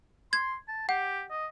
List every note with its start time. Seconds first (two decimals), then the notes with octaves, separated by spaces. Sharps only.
0.33 C6 G#6
0.68 A5
0.89 G4 F#5
1.30 D#5